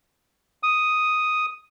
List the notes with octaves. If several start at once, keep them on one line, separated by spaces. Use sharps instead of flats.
D#6